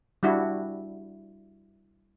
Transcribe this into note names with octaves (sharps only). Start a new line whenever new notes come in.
G3 D4 E4 F#4